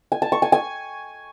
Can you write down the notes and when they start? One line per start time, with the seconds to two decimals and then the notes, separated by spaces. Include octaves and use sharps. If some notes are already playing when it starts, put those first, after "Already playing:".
0.12 G#5
0.22 A5
0.32 C#6
0.42 G#5
0.52 G#5